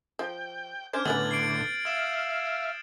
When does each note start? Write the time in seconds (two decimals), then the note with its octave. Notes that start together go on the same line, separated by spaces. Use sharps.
0.19 F3 G5
0.93 C#4 D4 C5 D6 F6 G6 G#6
1.05 A2 D3 B3 C#4 B4 A6 F#7
1.31 C7 D7
1.85 E5 F5 D#6 A6 E7